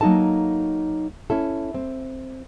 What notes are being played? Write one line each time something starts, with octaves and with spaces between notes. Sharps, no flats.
F#3 A#3 D#4 A4 A5
C#4 E4 A4
C4